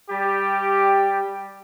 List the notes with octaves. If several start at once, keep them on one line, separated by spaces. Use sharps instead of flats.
G3 G4